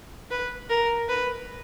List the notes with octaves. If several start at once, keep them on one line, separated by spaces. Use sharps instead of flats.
B4
A#4
B4